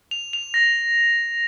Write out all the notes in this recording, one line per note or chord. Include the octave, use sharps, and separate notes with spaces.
F7
F7
A#6